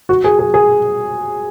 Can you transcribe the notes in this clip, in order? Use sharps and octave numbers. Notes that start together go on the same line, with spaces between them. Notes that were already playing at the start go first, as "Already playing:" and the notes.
F#4
G#4
G#4
G#4